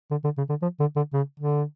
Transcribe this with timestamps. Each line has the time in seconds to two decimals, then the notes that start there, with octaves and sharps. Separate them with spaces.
0.11 D3
0.24 D3
0.38 C#3
0.49 D3
0.62 F3
0.80 D3
0.96 D3
1.14 C#3
1.40 D3